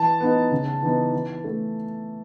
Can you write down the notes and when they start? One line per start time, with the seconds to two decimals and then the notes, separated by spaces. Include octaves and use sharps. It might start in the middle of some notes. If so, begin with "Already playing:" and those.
Already playing: E3 A5
0.20 B3 D#4
0.52 C#3
0.83 E3 B3 D#4
1.13 E3
1.44 A3 E4